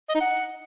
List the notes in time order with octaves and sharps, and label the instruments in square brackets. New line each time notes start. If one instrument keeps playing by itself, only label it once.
[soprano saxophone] D#5
D#4
F#5